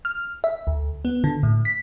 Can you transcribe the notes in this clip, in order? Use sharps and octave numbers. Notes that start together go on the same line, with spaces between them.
F6
E5
D2
B3
D3
A2
B6